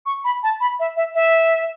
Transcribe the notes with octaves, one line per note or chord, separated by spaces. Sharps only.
C#6
B5
A5
B5
E5
E5
E5